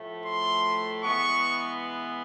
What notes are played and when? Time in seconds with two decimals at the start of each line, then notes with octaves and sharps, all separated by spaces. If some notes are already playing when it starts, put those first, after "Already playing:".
Already playing: A2 F3 A3
0.25 C6
1.03 E3 G#3 B3 C#6